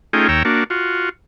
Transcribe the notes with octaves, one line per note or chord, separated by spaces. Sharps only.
A3 C#4 D#4 F4 G#4 G5
D#2 C#5 G5 A#5 E6
A#3 D4 F#4
F4 F#4